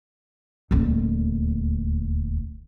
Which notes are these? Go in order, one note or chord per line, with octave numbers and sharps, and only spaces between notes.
D#1 D2